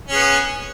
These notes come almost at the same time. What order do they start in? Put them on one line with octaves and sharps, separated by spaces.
C#4 G#4 B3